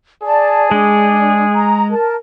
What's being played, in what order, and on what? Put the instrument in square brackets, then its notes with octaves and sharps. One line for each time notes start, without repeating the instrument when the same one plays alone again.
[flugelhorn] G#4 [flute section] D5 A5
[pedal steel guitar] G#3 [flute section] D4
[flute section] A#5
A#4 A5